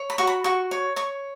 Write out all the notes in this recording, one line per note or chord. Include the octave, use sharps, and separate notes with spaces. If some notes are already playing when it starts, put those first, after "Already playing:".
Already playing: C#5
B5
F#4 C#6
B5
F#4 C#6
C#5
C#5 C#6